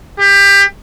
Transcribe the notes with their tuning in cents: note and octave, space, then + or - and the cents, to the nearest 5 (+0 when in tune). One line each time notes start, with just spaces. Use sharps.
G4 +25